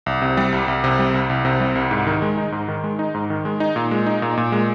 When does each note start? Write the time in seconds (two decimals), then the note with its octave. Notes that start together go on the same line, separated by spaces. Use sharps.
0.06 C2
0.22 C3
0.37 G3
0.52 C2
0.68 C2
0.84 C3
0.99 G3
1.14 C2
1.30 C2
1.45 C3
1.60 G3
1.75 C2
1.91 G#2
2.07 D#3
2.22 G#3
2.37 D#4
2.52 G#2
2.68 D#3
2.84 G#3
2.99 D#4
3.14 G#2
3.30 D#3
3.45 G#3
3.60 D#4
3.76 A#2
3.91 G#3
4.06 D#4
4.22 A#2
4.37 A#2
4.52 G#3